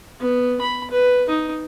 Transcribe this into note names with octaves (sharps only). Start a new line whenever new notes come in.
B3
B5
B4
D#4